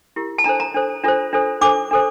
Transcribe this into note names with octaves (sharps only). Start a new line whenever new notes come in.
E4 G4 A#4
A5
D4 A4 C5 A#5
A#5
D4 A4 C5
D4 F4 A4 C5
D4 F4 A4 C5
D4 A4 C5 D6
D4 A4 C5